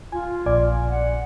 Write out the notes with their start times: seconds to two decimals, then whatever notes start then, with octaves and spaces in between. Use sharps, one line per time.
0.12 F4 G#5
0.46 A#1 D5 G#5
0.90 F#5